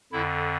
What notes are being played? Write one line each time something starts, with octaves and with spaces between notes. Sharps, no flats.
F2 D3 E4